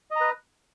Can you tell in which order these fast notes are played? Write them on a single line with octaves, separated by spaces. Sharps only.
D#5 A#5 B4